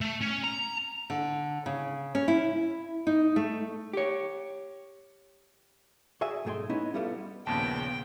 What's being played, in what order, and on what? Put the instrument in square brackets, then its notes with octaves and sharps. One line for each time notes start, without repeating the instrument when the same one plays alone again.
[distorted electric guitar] A3
C#4
A#5
[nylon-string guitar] D3
C#3
C#4
E4
D#4
A3
[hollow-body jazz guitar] G4 C#5
F#4 G#4 D5 E5 G#5
B1 G#2 A3 G#4 G5 C6
B3 C#4 D#4 E4 D#5
G3 A3 B3 F4 G4 A4
[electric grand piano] A#1 D#2 A#2 [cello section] C#3 B3 [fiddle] G5 [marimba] A5